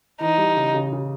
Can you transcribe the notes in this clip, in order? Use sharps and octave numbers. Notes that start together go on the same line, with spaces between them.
E3 D#4
G3
C#3
C#3
C#3